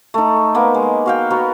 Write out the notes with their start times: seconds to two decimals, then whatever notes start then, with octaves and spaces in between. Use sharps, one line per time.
0.14 A3 D#4
0.55 A#3 B3
0.74 G#3
1.06 F#4 F5 G5
1.30 B3 F#4 A#4